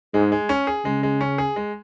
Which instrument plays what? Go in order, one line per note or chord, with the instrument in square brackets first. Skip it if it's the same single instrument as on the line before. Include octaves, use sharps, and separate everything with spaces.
[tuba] G#2 [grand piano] G#3
[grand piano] G#3
C#4
G#4
[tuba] C#3 [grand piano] G#3
[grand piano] G#3
C#4
G#4
G#3